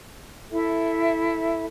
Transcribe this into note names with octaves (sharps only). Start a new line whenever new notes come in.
E4 A4 E5